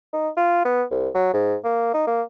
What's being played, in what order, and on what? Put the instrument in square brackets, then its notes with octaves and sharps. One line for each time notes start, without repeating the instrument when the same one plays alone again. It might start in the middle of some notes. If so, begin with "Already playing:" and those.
[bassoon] D#4
F4
B3
C2
F#3
G#2
A#3
D#4
A#3